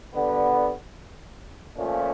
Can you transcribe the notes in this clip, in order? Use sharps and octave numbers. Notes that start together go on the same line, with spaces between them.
D3 G3 B3
A#2 F3 A3 C#4